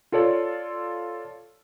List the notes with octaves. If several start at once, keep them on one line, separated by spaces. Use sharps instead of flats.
F4 A4 C#5 D5